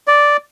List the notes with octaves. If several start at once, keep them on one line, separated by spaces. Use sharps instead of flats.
D5